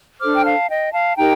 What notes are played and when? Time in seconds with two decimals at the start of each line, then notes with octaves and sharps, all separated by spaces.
0.20 D4 A4 C5 D6 F6
0.34 G5
0.44 F5 A5
0.69 D#5 G5
0.92 F5 A5
1.16 D#4 G4 A#4 G5 A#5